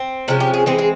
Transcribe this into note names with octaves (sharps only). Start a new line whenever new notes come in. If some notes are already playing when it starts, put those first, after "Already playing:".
Already playing: C4
C3 F3 G#3 C#4
G4
G#4
E3 G#3 C4 G#4
G#4